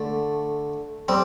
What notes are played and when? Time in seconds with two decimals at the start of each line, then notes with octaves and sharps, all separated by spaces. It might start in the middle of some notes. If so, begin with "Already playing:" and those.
Already playing: D3 A3
1.08 G3 C4